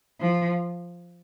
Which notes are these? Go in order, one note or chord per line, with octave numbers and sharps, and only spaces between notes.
F3